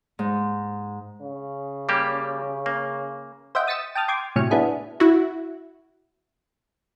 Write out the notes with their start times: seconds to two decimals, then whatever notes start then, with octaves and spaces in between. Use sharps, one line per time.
0.19 G#2
1.22 C#3
1.89 G3 A#3 G4
2.66 A#3
3.55 C5 D#5 E5 F#5 G5
3.67 D#6 A6 B6 C#7 E7
3.95 G5 A5 D#6 F6 A6
4.08 G5 C6 D6 G#6
4.36 A2 C3 F#3 G#5 F6 C#7
4.51 B3 D4 E4 G#4
5.00 E4 F#4